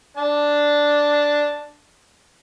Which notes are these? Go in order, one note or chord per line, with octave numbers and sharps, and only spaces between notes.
D4 A5